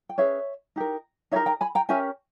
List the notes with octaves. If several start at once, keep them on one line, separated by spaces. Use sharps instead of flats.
G5
C#4 G#4 B4 C#5 E5
D#4 G4 A#4
D#4 G4 A#4 C#5 E5
G5 A#5
G#5 B5
G5 A#5
C#4 G4 A#4 E5 G#5